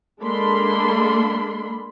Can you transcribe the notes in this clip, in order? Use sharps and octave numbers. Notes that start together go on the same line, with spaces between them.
G#3 A#3 D4 A4 B5 C6